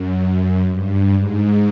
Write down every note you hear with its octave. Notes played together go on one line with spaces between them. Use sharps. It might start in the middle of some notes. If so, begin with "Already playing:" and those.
Already playing: F#2
G2
G#2